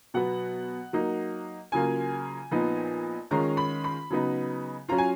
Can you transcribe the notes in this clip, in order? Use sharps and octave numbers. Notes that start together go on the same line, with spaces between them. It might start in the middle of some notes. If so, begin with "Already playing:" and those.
B2 F#3 B3 F#5
F#3 A#3 D#4
C#3 F#3 A#3 F4 G#5
A#2 F3 B3 D#4
D#3 G#3 C#4 F4 A#5
B5
B5
C#3 F#3 B3 D#4
F#3 C#4 F4 A#5
G#5